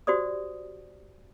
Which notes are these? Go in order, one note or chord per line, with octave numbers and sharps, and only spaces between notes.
F#4 G4 C5 D5 D#6